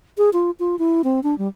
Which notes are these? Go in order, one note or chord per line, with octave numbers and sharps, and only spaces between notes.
G#4
F4
F4
E4
C4
D4
G3